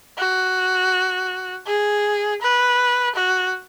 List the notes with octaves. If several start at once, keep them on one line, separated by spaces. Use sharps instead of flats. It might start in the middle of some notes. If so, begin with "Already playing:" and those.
F#4
G#4
B4
F#4